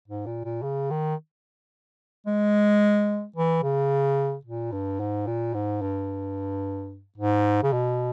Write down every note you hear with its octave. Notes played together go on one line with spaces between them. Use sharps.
G#2
A#2
A#2
C#3
D#3
G#3
E3
C#3
A#2
G2
G#2
A#2
G#2
G2
G#2
C#3
B2